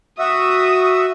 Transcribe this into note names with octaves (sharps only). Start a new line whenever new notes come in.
F#4 E5 D#6